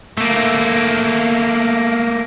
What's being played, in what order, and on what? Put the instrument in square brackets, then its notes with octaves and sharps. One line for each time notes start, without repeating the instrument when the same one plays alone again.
[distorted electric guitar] A3 A#3